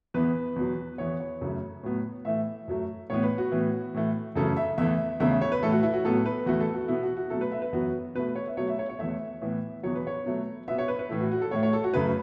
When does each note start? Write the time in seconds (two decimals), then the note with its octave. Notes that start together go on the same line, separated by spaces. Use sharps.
0.14 E2 E3 B3 B4
0.56 E2 B2 F#3
0.98 E2 E3 B3 C#5
1.20 C#5
1.41 F#2 C#3 A3
1.83 A2 F#3 B3
2.25 A2 E3 A3 E5
2.68 F#2 F#3 A3
3.10 A2 E3 B3 C#5
3.23 B4
3.38 F#4
3.51 A2 E3 B3
3.94 A2 E3 A3
4.35 F#2 C#3 E3 A3 A4
4.57 E5
4.78 E2 E3 A3 E5
5.20 E2 C#3 A3 E5
5.31 E5
5.41 C#5
5.52 B4
5.62 A2 E3 A3 A4
5.72 F#4
5.83 E4
5.94 F#4
6.05 A2 F#3 B3 A4
6.26 B4
6.46 E2 E3 A3 F#4
6.60 A4
6.74 F#4
6.88 B2 B3 E4
7.03 F#4
7.17 F#4
7.30 B2 F#3 A3 A4
7.41 B4
7.52 E5
7.62 B4
7.73 F#2 E3 B3 F#4
8.15 B2 A3 B4
8.35 C#5
8.47 E5
8.57 B2 F#3 A3 C#5
8.68 E5
8.79 C#5
8.89 C#5
8.99 E2 E3 A3 E5
9.41 A2 E3 B3
9.83 E2 B2 F#3 C#5
9.95 B4
10.07 C#5
10.26 B2 F#3 A3
10.68 B2 B3 E5
10.78 C#5
10.88 B4
10.99 B4
11.09 A2 E3 A3 E4
11.20 F#4
11.32 F#4
11.42 A4
11.51 A2 A3 C#5
11.63 C#5
11.73 A4
11.84 F#4
11.94 F#2 C#3 A3 B4